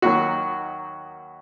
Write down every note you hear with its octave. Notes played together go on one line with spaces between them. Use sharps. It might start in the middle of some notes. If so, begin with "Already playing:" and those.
D#2 D#3 F#3 F#4